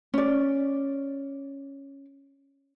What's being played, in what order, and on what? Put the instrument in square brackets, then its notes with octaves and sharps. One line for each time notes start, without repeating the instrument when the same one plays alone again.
[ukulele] C#4 D5